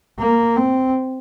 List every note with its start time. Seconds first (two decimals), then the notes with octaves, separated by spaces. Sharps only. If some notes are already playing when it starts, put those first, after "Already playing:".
0.19 A#3
0.56 C4